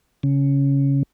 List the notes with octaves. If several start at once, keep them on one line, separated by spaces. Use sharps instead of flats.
C#3